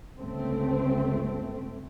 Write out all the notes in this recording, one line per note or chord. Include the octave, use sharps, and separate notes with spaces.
G1 C#2 A3 C4